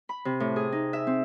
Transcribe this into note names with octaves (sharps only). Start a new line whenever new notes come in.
B5
C3
A2
G#4
D#4
E5
C4